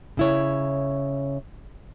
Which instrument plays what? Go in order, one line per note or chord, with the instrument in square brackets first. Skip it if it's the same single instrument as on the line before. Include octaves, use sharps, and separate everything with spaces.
[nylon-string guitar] C#3 E4 C#5